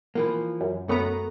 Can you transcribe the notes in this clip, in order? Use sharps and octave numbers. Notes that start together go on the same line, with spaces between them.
E3 F3 A#3
F#2
F#2 A3 B3 A#5